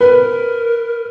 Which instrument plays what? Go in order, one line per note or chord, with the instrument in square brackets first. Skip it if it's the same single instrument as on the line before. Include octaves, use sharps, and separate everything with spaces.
[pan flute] A#4 [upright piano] B4